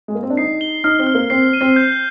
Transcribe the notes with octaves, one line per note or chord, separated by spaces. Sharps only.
G#3
A#3
C4
D4
D#4 C7
G7
D#4 F6
C4
F6
A#3
C4 C7
D#7
C4
G6